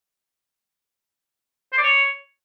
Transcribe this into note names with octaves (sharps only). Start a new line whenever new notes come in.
C5
D5
C#5